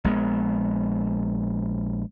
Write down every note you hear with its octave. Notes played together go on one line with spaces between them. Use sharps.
A#1 G#3 B3